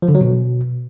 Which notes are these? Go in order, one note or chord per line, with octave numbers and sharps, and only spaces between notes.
F3
D3
F#3
B2